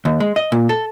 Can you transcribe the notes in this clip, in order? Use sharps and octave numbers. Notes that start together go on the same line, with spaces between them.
D#2
G#3
D#5
A#2
A4